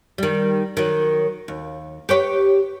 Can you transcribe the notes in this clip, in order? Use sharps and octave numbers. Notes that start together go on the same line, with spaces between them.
D#3 G3
D#3 F#3
D#2
G4 B4 C#5